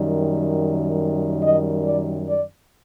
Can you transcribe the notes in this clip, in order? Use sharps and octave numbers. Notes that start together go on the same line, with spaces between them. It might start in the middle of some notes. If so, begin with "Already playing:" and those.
Already playing: F#2 D#3 G3
D#5
D5
D5